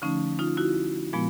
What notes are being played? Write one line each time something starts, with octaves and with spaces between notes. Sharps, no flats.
D3 F3 A3 C#4 D#4
D#4 F4
E4 F#4
A#2 F3 G#3 B3